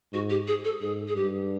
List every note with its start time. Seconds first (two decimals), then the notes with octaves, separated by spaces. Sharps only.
0.13 G#2 F#4
0.29 G4
0.47 G#4
0.64 A4
0.81 G#2 G#4
1.07 G#4
1.15 G2 G4